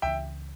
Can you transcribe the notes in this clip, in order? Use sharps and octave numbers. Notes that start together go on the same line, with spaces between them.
C#2 C#3 E3 E5 G5